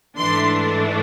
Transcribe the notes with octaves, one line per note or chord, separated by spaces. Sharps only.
G#2 E3 A3 D4 C6